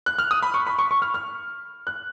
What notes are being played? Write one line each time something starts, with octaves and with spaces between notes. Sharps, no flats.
F#6
F6
D#6
B5
C#6
B5
C#6
C#6
F6
F6
F#6